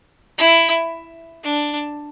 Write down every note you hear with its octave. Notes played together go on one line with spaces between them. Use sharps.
E4
D4